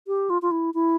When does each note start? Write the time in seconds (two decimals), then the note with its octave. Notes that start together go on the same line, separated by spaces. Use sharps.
0.07 G4
0.30 F4
0.42 F4
0.51 E4
0.74 E4